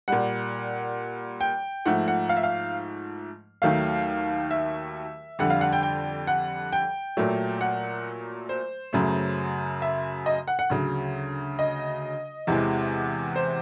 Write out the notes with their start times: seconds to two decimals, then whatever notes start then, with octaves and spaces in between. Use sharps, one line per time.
0.08 A#2 G3 F#5
1.41 G5
1.86 G#2 F3 A3 F#5
2.08 F#5
2.29 F5
2.37 E5
2.43 F5
3.62 D#2 D#3 F#3 A3 F5
4.51 E5
5.39 F2 D3 G3 F#5
5.50 F5
5.61 F#5
5.73 G5
5.83 G5
6.27 F#5
6.73 G5
7.17 A#2 F#3 A3
7.61 F#5
8.49 C5
8.93 F#2 C#3 F#3 A3
9.82 E5
10.26 D#5
10.48 F#5
10.59 F#5
10.70 D2 C#3 F#3
11.59 D#5
12.47 E2 C3 E3 G#3
13.36 C5